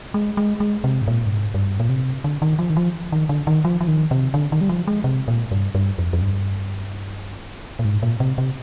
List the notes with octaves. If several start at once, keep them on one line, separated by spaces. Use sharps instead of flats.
G#3
G#3
G#3
C3
G#2
A#2
G2
G#2
G2
A#2
C3
D3
D#3
F3
D#3
F3
D#3
D3
D#3
F3
F3
D#3
C3
D3
D#3
G3
F3
G#3
C3
A#2
G2
G2
F2
F2
G2
A#2
G#2
A#2
C3
C3